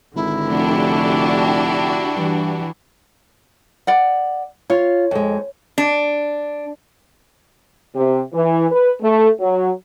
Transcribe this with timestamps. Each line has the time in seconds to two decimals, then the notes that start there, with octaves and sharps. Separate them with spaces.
0.15 G#1 D3 E4
0.50 F1 D4 F#4 G4
2.16 G2 E3
3.87 D5 F#5
4.70 F4 C#5
5.11 F2 G#3
5.78 D4
7.95 C3
8.33 E3
8.71 B4
9.01 A3
9.40 F#3